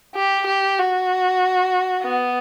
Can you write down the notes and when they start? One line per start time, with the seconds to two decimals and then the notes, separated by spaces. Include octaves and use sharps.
0.15 G4
0.46 G4
0.78 F#4
2.03 B3